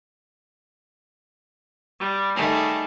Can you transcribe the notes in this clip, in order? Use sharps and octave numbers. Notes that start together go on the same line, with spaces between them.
G3
D#3 G3 A3 G#4